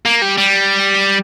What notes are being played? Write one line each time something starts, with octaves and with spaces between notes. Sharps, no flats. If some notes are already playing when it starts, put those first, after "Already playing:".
A#3
G3
G3